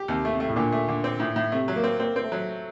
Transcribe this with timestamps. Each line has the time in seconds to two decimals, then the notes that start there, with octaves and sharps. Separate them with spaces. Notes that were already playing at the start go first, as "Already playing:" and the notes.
Already playing: G4
0.08 D#2 C3
0.25 A3
0.33 C3
0.40 A3
0.49 A2
0.56 A#2 D3
0.72 A3
0.89 D3
1.04 C4
1.20 A2
1.36 A2
1.52 C3 A3
1.68 F#3
1.76 A#3
1.84 C4
2.00 A#3 C4
2.16 C4
2.24 A3
2.32 F#3